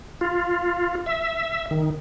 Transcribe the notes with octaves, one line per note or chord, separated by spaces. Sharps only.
F4
E5
D#3